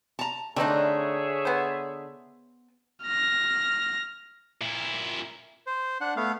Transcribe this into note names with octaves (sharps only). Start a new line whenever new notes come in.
A5 A#5
D3 A3 C4 D4 D#4 G#4 C#5 E5
B3 C5
F6 A#6
A#2 E4
C5
D4 F#5
A3 B3 F5